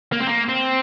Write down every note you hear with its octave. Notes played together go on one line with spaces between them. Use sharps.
A#3
C4
A#3
C4